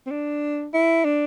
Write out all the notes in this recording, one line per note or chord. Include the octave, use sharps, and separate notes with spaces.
C4
D4
E4
D4